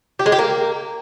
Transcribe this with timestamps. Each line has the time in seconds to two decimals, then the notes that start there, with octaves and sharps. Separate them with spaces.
0.19 G4
0.26 G#3
0.32 G4
0.39 A#3